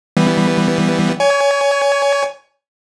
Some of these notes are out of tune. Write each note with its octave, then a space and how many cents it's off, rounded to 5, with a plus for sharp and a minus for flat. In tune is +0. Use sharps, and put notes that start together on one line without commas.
E3 +0 G3 +0 B3 +0
C#5 +25 G#5 +0